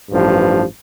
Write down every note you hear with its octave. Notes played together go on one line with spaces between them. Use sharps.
A1 G2 F3